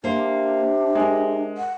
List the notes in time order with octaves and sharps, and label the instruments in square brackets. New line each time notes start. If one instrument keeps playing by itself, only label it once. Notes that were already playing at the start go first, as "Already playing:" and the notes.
[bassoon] C3 [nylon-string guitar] A#3 C5 [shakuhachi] D4
[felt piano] G#3 [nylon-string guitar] G#4 A#4
[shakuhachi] F#5